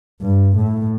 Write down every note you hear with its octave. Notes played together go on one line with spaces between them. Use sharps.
G2
A2